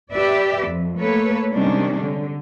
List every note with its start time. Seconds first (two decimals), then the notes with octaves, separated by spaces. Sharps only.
0.12 G4 B4 D5 E5
0.65 F2
0.99 A3 A#3 A4 B4 C#5
1.53 C3 D#3 G3 G#3 C#4 D4
2.01 D3